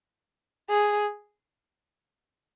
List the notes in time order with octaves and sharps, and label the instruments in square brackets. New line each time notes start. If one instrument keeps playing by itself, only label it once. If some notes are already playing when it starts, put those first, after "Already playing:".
[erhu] G#4